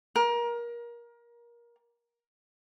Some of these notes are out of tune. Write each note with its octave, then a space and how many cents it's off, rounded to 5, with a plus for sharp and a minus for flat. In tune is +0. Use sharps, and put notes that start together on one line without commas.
A#4 +25